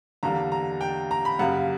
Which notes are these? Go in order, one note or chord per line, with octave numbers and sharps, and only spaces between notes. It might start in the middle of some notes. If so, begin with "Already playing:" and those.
E2 D3 G3 A#3 A#5
A#5
G5
A#5
B5
F#2 C#3 G3 A#3 F#5